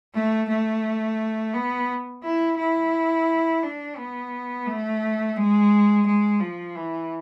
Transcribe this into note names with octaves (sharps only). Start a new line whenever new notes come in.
A3
A3
B3
E4
E4
D4
B3
A3
G#3
G#3
F3
E3